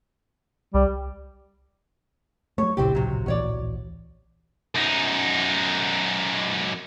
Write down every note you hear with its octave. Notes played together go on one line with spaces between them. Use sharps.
C2 G3
F#3 A3 C#5
D1 A#1 C#3 C4 E4 G4
C3 F#3
D1 A#1 E3 F#4 C#5 D5
F#2 D#4